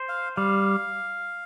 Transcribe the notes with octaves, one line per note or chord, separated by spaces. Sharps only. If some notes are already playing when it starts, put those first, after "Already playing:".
Already playing: C5
F5
G3 F5